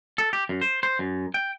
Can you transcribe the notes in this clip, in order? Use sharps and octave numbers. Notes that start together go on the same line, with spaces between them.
A4
G4
F#2
C5
C5
F#2
G5